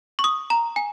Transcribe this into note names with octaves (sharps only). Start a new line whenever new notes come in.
C#6
D#6
A#5
G#5